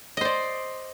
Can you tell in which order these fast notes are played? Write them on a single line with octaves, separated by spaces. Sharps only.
D#5 C5 D5